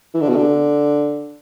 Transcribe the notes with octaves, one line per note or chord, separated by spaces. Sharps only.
E3
D3
B2
D3